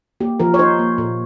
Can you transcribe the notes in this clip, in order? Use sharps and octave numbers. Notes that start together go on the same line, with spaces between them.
A#3 G4
F3 A#4
C#5
D#4 C5
A#3
A#2